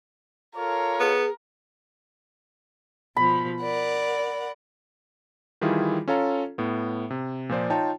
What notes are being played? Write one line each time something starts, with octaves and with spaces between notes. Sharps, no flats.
F4 A4 A#4 C#5
B3 G#4
B2 F3 B5
A#4 D5 F#5
D#3 E3 G3 E4 F4 G#4
C#4 F4 A4 C#5 F5 A#5
A2 B3
C3
A#2 F3 C5 D5
D#4 F4 C#5 G5 A5